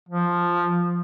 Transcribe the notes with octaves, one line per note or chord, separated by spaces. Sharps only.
F3